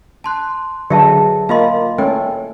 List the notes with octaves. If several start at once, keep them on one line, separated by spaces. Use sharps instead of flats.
A5 C6 F#6
D3 F#3 G#4 B4 D5 E5 A5
A#3 F4 D#5 F5 C6
A3 C#4 G5